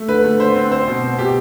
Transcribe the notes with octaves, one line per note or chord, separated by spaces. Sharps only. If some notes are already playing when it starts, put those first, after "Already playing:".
Already playing: A3
D3 B4
A3
D3 C5
C4
C4 C5
B2
C4
B2 G4